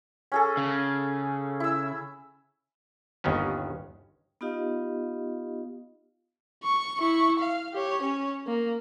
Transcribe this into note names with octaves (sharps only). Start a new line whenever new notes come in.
C#4 G#4 A4
C#3
E4 E6
G1 D#2 D#3 B3 C#4
B3 D#4 F4 G4 D#5 F5
C#6
E4 C#6
F5
G4 C#5
C#4 C#5
A#3